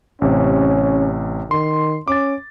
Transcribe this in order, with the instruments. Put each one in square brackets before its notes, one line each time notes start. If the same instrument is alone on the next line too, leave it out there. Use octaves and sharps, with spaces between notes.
[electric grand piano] A1 C3 [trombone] C#4
[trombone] D#3 [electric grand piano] C6
[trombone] C#4 [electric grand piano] D6 A6